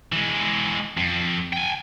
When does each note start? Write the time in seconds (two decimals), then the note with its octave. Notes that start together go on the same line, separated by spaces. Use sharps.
0.12 E3 G#3
0.97 F2
1.53 G5 G#5